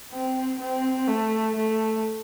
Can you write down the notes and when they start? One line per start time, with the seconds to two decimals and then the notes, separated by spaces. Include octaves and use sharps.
0.12 C4
0.60 C4
1.08 A3
1.56 A3